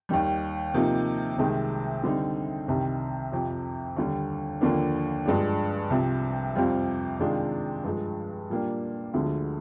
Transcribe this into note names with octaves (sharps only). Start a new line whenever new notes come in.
D#2 D#3 G3
C3 F3 A#3 D#4
C2 C3 D#3 G#3
D3 G3 C4 D#4
C2 C3 D#3 G3
F2 C3 F3
D#2 D3 G3
D#2 D3 F3 A#3 D4
G2 F3 G#3 D4
C2 C3 F3
F2 C3 G3 C4 F4
C3 D#3 G#3 D4 F4
G2 F3 G#3
A#2 G3 A#3 D4
D2 D3 F3 G#3